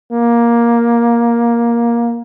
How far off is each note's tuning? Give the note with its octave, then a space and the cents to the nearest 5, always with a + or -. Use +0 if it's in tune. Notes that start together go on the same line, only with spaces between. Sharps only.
A#3 +10